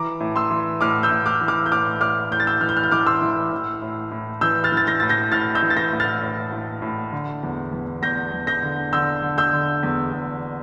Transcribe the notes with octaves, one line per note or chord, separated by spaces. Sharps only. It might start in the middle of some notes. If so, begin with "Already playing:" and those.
Already playing: E3 A#5 D6
A2
C6 E6
E3
A2 D6 F6
E6 G6
A2
D6 F6
E3
D6 F6
G6
A2 D6 F6
A2 D6 F6
A2 G6
A6
E6 G6
E3 F6
G6
F6
G6
E3 D6 F6
C6 E6
E3
A2
A2
A2
E3 E6 G6
F6 A6
E3
A6
G6 A#6
A2 A6
G6 A#6
A2 F6 A6
E6 G6
E3
A6
G6 A#6
A2
F6 A6
A2
A2
A2
D3
E2
E2
E2 G6 A#6
E2
G6 A#6
D3
D3 E6 G6
D3
E6 G6
D3
E2
E2